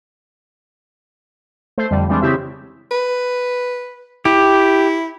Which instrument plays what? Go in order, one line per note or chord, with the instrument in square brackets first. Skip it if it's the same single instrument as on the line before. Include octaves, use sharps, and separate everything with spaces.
[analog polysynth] A3 C5
F2 D3 G3
E3 G3 G#3 C4 D4
C#3 C4 E4 G4 E5
[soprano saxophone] B4
[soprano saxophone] E4 [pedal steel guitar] G4